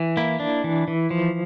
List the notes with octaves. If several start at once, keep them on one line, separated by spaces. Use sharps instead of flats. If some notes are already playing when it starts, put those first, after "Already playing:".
Already playing: E3
A#3 E4
D4
E3
E3
F3